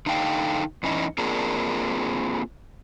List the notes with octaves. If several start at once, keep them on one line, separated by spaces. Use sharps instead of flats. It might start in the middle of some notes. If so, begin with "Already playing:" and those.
D3 D#4 A4 F5 G5
E2 E3 C#4 D#4
A#3 C4 D4 F4 G#4 A#4